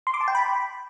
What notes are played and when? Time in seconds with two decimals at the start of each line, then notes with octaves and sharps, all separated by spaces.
0.07 C6
0.14 D6
0.21 A5
0.28 G5
0.35 B5